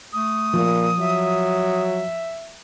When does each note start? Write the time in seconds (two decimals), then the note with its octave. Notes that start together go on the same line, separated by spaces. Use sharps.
0.13 A3 D#6
0.54 A#2 F3
1.00 F#3 E5